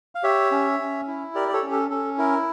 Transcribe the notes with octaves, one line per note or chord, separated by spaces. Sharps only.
F5
G4 C#5 E5
C#4
C#4
E4
G4 A#4 D5
D5
A4 C#5
C#4
A4
C#4 A4
E4 A#4